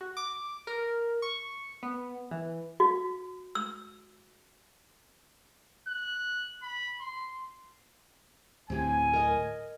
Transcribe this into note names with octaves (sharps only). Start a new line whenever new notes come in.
F#4
D6
A#4
C#6
B3
E3
F#4
E6
F#6
B5
C6
D1 A2 C4 G4 G#5
A#4 D#5